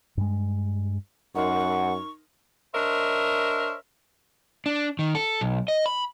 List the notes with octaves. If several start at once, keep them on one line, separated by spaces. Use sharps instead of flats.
G2 G#3
F#2 D#4 A#4 F#5 C6 C#6
D4 A#4 C5 C#5 D#5 E5
D4
D#3
A4
B1
D#5
B5